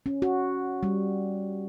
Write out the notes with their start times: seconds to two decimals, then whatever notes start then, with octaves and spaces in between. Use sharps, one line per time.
0.06 C#4
0.22 F#4
0.83 G3